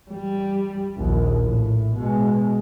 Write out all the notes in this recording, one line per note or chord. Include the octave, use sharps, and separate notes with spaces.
G3
A#1 D#2
A2
B2 G#3